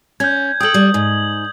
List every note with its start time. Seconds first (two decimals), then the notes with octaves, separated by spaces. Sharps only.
0.20 C#4 G6 G#6
0.60 A4 G5 D#6 G6 F#7
0.74 G3
0.94 G#2